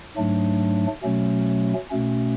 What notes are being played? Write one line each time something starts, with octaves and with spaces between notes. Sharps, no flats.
G#2 F#3 A3 D4
B2 F#3 A3 C#4
B2 A3 C#4